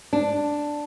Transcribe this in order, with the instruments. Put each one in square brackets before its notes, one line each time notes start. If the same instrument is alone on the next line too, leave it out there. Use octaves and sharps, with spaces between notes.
[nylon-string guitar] D4